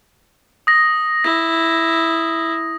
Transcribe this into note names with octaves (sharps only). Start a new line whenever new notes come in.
D#6 A#6
E4 A#6